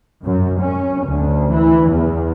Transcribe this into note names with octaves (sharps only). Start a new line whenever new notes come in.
F#2
C#4
D2
E3
E2